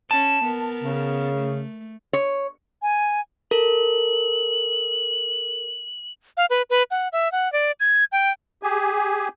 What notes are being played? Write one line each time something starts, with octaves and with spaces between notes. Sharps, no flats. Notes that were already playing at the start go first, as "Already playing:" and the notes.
C#4 A5
B3 A#4
C#3
A3
C#5
G#5
A4 A#4 F#7
F5
B4
B4
F#5
E5
F#5
D5
G#6
G5
G4 G#4 G#5